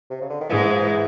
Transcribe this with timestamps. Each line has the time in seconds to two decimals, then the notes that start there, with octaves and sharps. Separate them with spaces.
0.10 C3
0.21 C#3
0.30 D3
0.40 D#3
0.49 G#2 E3 G#3
0.61 E3
0.71 F3
0.82 E3